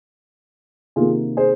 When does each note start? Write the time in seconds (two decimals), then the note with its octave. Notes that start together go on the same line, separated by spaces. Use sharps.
0.96 C3 D#3 A#3 F4 G#4
1.37 G#4 C5